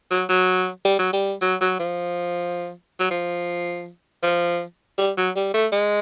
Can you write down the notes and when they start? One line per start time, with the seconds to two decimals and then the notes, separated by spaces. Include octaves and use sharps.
0.11 F#3
0.29 F#3
0.85 G3
0.99 F#3
1.13 G3
1.42 F#3
1.61 F#3
1.79 F3
2.99 F#3
3.10 F3
4.23 F3
4.98 G3
5.17 F#3
5.36 G3
5.54 A3
5.72 G#3